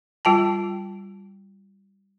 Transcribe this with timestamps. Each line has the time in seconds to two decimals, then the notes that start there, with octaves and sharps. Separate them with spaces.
0.25 G3 F4 G5 A5